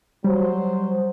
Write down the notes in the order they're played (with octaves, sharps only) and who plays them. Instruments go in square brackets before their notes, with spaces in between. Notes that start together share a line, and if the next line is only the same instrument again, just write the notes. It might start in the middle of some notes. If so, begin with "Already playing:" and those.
[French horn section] F#3 C5 [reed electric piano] G3